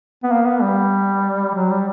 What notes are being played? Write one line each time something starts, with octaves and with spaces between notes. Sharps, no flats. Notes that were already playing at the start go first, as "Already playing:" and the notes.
B3
A#3
B3
G3
F#3
G3